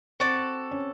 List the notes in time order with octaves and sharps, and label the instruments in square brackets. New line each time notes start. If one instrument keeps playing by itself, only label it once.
[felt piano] C4 [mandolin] F#4 A4 D5
[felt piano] C#4